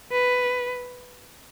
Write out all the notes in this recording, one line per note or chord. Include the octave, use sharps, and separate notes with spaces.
B4